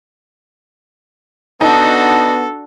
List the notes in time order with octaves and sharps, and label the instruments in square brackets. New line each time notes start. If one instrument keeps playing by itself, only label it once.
[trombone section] B3 [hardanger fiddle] D4 F#4 [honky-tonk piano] D#4 [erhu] A4